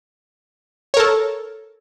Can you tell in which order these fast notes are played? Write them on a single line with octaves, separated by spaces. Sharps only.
C#5 A#4 A4